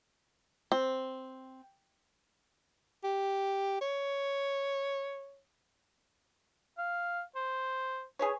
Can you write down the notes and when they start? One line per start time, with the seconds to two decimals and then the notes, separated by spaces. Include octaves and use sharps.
0.72 C4
3.04 G4
3.81 C#5
6.78 F5
7.36 C5
8.19 G#4 B4 C#5